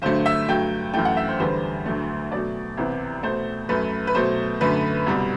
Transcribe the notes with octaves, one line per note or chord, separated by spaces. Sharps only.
G2 D3 F#3 A3 C5
E5
G2 F#3 A3 G5
F#2 E3 A3 G5
F#5
E5
C5
E2 D3 G3 B3 C5
D2 D3 F#3 A3
B2 F#3 A3 D5
C2 C3 E3 B3
B2 A3 C5
F#2 F#3 A3 B4
B4
B2 F#3 A3 C5
F#2 D3 A3 B4
C2 B2 G3